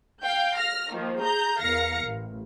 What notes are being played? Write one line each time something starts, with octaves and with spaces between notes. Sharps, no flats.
F5 G5 G6
F6 A#6
D#3 F3 A#3
G#4 A#5 G6
E2 A#4 F5 A#6 C#7
A1